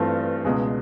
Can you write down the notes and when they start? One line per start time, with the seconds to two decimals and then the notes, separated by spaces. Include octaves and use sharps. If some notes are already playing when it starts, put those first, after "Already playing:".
Already playing: G2 E3 A3 C4 F4
0.45 C#2 B2 G#3